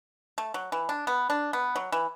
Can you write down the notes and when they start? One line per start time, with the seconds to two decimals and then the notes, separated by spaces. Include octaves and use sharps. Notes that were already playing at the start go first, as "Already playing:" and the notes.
0.38 A3
0.54 F#3
0.72 E3
0.89 D4
1.07 B3
1.30 D4
1.53 B3
1.76 F#3
1.92 E3